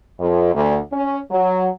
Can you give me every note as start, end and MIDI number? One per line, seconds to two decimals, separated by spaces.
0.19 0.52 41
0.54 0.77 38
0.92 1.16 61
1.30 1.67 54